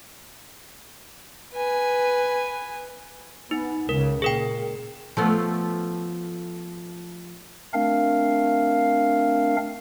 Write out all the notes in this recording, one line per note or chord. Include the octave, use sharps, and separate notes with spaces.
B4 G#5
B3 D#4
C#2 C#3 A#4
A#2 G#4 A#4 G5
F3 A3 B3
A3 C4 D4 A#4 F5